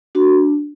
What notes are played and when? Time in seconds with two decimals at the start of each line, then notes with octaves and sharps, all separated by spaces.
0.15 D4 F#4